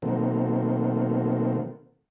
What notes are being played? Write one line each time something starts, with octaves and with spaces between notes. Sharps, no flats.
B2 D#3 F#3 A3 A#3 C4